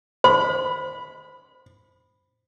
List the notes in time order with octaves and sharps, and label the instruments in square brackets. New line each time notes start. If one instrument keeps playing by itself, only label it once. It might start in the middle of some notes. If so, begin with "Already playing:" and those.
[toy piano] C5 [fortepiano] B5